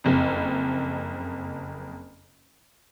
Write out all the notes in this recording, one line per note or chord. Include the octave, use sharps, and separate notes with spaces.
F#1 F2